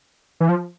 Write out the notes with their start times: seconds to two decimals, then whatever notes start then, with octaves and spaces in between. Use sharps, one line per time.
0.40 E3
0.49 F3